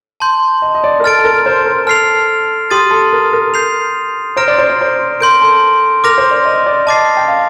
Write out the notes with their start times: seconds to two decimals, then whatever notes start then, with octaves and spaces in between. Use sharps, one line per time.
0.20 A5 C6 G6
0.62 D#5
0.75 D#5
0.84 D5
1.00 A#4
1.04 A4 F6 A6 D7
1.19 A4
1.24 A#4
1.46 C5
1.66 A#4
1.87 A4 F6 C7 F7
2.70 G4 C6 D#6 A6 D#7
2.91 A4
3.13 A#4
3.33 A#4
3.54 G6 C7 F7
4.37 C5 A#5 F6 A#6 D7
4.48 D5
4.58 C5
4.70 D5
4.81 C5
5.20 A#4 C6 G6 D7
5.42 A4
6.04 A#4 D6 F6 A#6 F7
6.18 C5
6.31 D5
6.45 D#5
6.66 D5
6.87 D#5 A5 D6 A6 C7
7.17 G5
7.28 F5